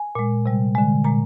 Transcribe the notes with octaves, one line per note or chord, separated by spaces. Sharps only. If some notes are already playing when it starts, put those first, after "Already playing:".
Already playing: G#5
A#2 G#3
C3 G3
D3 G#3
A#2 G#3 A#5